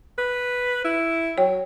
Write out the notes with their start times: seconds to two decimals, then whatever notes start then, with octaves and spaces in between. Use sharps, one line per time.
0.18 B4
0.84 E4
1.38 F#3 C#5 G5